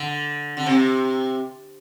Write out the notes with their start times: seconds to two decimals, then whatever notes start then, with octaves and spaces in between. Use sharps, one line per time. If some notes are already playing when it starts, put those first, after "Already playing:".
Already playing: D3
0.57 D3
0.66 C3